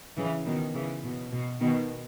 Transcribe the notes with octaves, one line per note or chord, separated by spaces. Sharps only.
C#3 E3
B2 D#3
C#3 E3
B2
B2
B2 D#3